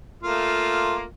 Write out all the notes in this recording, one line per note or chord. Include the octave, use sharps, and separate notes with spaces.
A3 A#3 F4